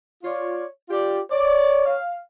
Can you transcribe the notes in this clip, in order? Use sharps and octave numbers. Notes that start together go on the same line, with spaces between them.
F4 C#5 D5
F4 G4 D5
C#5 D5
F5